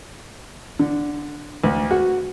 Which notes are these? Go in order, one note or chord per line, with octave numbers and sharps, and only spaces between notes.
D3
D2
F#4